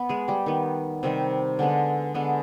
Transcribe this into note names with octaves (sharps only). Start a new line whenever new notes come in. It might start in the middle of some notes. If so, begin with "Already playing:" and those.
Already playing: B3 B4
G#3 G#4
G3 G4
D#3 B3
C3 D#3 G3
D3 G#3 B3
D3 G#3 B3